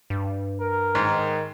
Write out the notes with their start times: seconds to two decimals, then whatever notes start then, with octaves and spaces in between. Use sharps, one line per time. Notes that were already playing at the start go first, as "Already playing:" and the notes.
0.10 G2
0.60 A#4
0.95 G#2 D#3